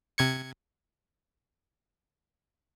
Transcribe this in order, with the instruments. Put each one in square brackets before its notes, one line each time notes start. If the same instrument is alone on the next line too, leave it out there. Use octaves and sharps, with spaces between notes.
[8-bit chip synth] C3 G#6 C#7